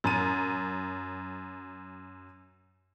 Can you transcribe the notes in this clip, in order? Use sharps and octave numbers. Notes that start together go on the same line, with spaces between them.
F#2 D#7